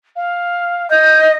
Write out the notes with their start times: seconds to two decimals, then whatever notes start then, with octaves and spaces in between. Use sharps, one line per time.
0.16 F5
0.90 D#5 G6